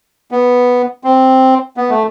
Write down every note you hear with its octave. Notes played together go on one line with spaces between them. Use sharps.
B3
C4
B3
A3